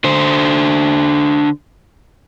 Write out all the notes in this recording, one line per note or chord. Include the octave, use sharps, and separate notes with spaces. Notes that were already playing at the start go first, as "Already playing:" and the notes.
D3 C5